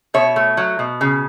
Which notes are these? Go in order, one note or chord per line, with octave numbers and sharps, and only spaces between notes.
B2 C#5 E5
A3
F#3
B2
C#3